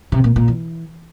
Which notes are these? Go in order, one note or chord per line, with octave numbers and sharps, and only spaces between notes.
C3
A#2
A#2
E3